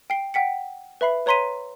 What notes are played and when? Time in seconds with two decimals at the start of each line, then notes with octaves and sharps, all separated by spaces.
0.10 G5 C7
0.34 F#5 G5 B6 C#7
1.01 B4 E5 B5 C7
1.26 B4 C#5 A#5 C6 B6 D#7